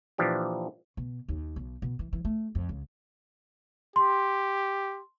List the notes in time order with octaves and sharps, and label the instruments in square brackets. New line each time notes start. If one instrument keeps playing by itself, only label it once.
[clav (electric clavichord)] A#2 E3 F3 D4 G4
[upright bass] B2
D#2
B1
B2
E3
E3
A3
F2
C#2
[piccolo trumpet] G4 [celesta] C6